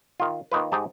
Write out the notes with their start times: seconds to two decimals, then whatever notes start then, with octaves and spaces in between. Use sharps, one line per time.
0.20 D#3 F4
0.52 D#3 A#3 D#4 F4 B4
0.72 G#2 D#4 G4 A5